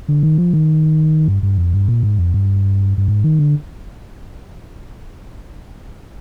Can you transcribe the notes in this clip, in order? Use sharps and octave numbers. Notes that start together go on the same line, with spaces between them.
D3
D#3
F3
D#3
G2
G2
F2
G2
A#2
G#2
F2
G2
G2
G#2
D#3
D3